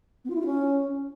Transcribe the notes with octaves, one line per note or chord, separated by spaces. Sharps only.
B3
F4
E4
F4
C#4